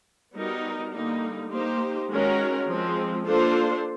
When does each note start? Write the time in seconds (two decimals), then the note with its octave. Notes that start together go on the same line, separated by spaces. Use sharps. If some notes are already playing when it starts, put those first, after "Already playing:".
0.34 G3 B3 D#4 F#4 A#4
0.92 D3 G3 A#3 D#4
1.51 A#3 D#4 G4 C5
2.09 D#3 G#3 C#4 F#4 A#4
2.68 F3 G#3 C4
3.26 A#3 D4 F4 A4 C5